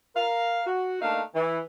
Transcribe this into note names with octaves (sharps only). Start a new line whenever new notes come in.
A#4 F5
F#4
A3 A#3 D4 D#4 F5
E3